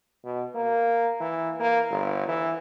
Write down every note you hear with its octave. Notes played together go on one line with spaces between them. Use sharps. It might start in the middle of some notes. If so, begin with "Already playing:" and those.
B2
A#3
E3
A#3
G1
E3